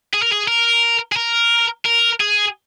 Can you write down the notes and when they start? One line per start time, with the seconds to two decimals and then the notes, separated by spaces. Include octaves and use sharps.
0.13 G#4
0.22 A#4
0.32 G#4
0.48 A#4
1.12 G#4
1.16 A#4
1.85 A#4
2.20 G#4